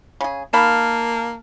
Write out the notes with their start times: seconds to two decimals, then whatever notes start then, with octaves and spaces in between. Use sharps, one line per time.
0.21 C#3 G#4
0.53 D#3 A#3 F5 A5 B5 F6